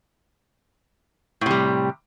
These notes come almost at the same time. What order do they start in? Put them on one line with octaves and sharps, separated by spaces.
A2 C3 G3